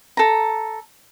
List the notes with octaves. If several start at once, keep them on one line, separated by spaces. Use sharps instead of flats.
A4 A#5